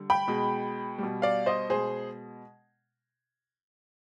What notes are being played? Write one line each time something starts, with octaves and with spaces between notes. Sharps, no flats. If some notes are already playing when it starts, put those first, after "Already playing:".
Already playing: D3 G3
G5 B5
B2 G#3
B2 G3
D5 F5
C5 D#5
B2 G#3 G#4 C5